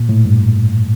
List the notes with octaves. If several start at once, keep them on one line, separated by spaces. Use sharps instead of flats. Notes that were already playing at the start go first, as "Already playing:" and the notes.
Already playing: A#2
A2
G2